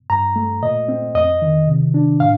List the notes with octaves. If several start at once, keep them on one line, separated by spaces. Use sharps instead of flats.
G2 A#5
A3
A#2 D#5
C4
F2 D#5
D#3
C3
D4
A2 F5